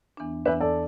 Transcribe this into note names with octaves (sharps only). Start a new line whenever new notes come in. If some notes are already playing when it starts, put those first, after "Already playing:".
E2 E3 B3 D4
E2 E3 B3 D4 B4 E5
A4 D5